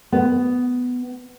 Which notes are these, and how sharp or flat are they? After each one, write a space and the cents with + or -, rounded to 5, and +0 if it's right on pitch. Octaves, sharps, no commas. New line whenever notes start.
B3 +10